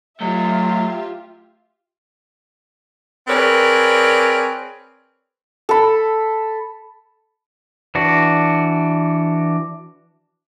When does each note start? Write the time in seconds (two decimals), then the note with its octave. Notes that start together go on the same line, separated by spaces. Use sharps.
0.21 F#3 A3 F4 G4 D#5 E5
3.28 C4 G#4 A#4 B4 C#5 D5
5.69 A4 B5
7.95 E3 D4 F#4